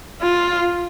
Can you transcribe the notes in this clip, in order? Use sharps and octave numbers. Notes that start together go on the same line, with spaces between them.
F4